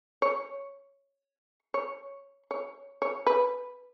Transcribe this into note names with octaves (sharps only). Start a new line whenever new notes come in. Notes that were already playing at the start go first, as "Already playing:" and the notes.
C#5
C#5
C#5
C#5
B4